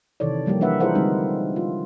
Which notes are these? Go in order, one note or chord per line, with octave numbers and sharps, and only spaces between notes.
C3 D#3 E3 A4 C#5 D5
F3 G3 A#3 G4
E3 A#3 D4 B4 E5 F#5
E4 F4 G#4 A#4 C5 F#5
D3 G3 G#3 C4 D#4
F4